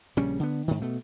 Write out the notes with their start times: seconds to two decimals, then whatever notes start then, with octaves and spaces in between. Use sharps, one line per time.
0.17 A#1 C#3 G3 C#4
0.40 D3 B3
0.68 G#2 D#3
0.82 B2 A3